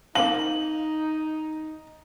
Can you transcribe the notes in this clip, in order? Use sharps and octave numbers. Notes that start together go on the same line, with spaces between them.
A#3 C4 D#4 F4 F#7